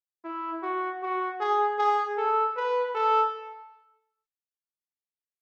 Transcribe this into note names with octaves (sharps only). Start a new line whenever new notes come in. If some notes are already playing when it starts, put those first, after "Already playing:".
E4
F#4
F#4
G#4
G#4
A4
B4
A4